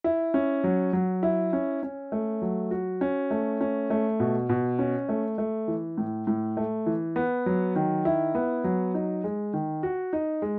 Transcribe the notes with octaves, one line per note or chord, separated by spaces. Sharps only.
E4
C#4
F#3
F#3
E4
C#4
C#4
A3
F#3
F#4
C#4
A3
C#4
A3
B2
B2
C#4
A3
A3
E3
A2
A2
A3
E3
B3
F#3
D#3
E4
B3
F#3
D#4
G#3
D#3
F#4
D#4
G#3